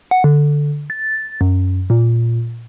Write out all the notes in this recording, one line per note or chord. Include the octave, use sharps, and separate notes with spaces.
F#5
D3
A6
F#2
A#2